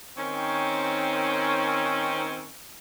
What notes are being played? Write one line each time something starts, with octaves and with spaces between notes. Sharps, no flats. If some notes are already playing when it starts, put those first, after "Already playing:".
D#3 C4 C#4